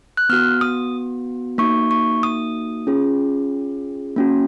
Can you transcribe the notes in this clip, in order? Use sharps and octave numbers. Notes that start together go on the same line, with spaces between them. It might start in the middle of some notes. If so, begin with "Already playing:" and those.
F#6
B3 F#4 F6
D#6
A#3 D#4 F#4 C#6
C#6
D#6
C#4 F4 G#4
A#3 C#4 F#4